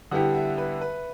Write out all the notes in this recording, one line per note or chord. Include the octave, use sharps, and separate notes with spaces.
D3 G3 B3 E4 G4 F#5
E5
B4
B4